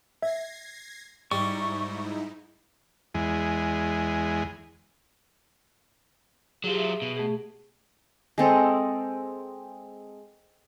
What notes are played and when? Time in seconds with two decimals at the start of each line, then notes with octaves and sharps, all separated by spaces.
0.22 E5 G#6 A#6 C7
1.32 G#2 G3 D#4 E4 C#6
3.14 E2 G#3
6.64 F#3 F4 G4 G#4
6.77 E5
7.02 B2
7.17 A3 G#4
8.38 G#3 C4 A4 D#5